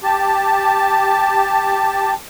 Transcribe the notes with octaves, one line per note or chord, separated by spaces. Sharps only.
G4 A5